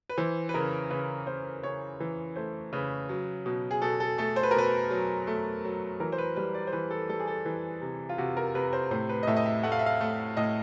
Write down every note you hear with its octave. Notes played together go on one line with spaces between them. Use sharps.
B4
E3 C5
B4
C#3 A#4
C#3 B4
C#3 C5
C#3 C#5
E3
A3 C5
C#3 B4
F#3
B2
G#4
B2 A4
A4
A3 A4
C5
B4
A#4
B2 B4
F#3
A3
F#3
E3 A#4
C5
B4
G3 B4
D5
C5
E3 B4
A4
G3 A4
G#4
A4
E3
C3
F4
C3 F#4
A#4
C3 B4
C5
A2 C5
B4
D#5
A2 E5
D#5
E5
A3 F#5
F5
E5
F5
A3
A2 D#5